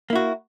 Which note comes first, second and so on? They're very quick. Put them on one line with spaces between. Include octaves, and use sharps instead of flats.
A#3 E4 F#4